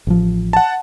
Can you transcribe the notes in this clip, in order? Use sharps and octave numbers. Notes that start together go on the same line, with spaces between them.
A1 F3
F#5 A5